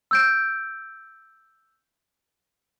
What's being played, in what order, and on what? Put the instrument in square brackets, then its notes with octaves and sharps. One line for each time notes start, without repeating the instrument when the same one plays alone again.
[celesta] E6 G6 D7